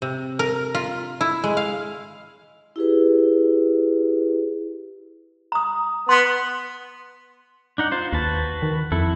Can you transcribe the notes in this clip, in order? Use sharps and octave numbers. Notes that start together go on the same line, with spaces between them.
C3
A#4
F4
E4
G#3
F5
E4 G4 G#4 B4
A#5 D#6
B3 C6
D4 D#4 F#5
F4 C5
D#2 F#4 B4 A5
D#3
F2 E4 A4